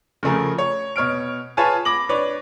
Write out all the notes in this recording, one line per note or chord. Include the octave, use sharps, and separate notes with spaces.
C#3 F3 A3 G#4 A#4
C#5
B2 C#5 F6 D7
F4 G#4 B4 C#5 G#5 A5
B5 D6 A#6 F#7
D4 B4 C#5 D5